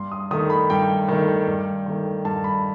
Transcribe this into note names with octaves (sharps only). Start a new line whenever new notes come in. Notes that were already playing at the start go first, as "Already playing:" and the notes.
Already playing: G2 C6
D#6
D#3 A3 D#6
B5
G2 G5
D#3 A3
G2
D#3 A3
G2 A5
B5